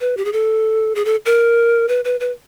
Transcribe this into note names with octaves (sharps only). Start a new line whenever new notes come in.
B4
G4
G#4
A4
G#4
A4
A#4
B4
B4
B4